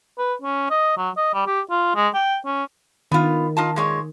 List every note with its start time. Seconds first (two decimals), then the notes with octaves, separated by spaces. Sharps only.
0.18 B4
0.42 C#4
0.71 D#5
0.97 F#3
1.17 D#5
1.34 G3
1.46 G4
1.70 F4
1.96 G#3
2.14 G5
2.45 C#4
3.11 D#3 B3 F4
3.57 D#4 F4 A5
3.76 A#2 G#3 C#5